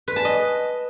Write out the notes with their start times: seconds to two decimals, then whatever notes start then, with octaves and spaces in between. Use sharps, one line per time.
0.08 B4
0.16 A5
0.25 D#5